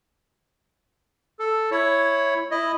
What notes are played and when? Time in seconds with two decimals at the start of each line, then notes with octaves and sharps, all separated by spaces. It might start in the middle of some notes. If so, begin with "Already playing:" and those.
1.39 A4
1.71 E4 C#5
2.51 E4 D#5